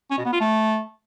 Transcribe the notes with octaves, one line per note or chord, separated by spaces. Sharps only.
C#4
B2
B3
F4
A3